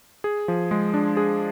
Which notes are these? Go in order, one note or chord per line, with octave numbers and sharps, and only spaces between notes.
G#4
F3
G#3
D4
G#4